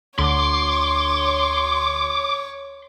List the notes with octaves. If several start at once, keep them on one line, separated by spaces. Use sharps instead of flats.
D2 D3 C#5 C6 D6